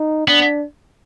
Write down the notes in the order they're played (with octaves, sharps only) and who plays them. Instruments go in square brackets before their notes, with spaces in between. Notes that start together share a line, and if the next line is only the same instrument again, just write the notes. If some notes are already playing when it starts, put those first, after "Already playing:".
Already playing: [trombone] D#4
[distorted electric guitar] B3 [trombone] D4